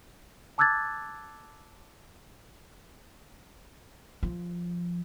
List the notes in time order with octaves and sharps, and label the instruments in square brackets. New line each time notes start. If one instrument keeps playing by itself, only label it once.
[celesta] A5 D6 E6 F#6 G#6 A6
[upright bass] F3